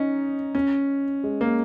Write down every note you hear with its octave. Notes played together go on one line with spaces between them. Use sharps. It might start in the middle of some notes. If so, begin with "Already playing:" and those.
Already playing: C#4 D#4
C#4
G#3
A#3